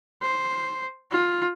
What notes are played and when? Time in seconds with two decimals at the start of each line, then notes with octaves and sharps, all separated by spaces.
0.22 C5
1.11 F4